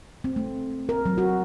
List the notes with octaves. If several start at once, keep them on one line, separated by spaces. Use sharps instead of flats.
C4
A3
A#4
F#3
F#4